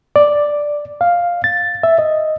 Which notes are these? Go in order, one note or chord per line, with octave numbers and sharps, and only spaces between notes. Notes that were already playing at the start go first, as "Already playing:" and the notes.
D5
F5
A6
E5
D#5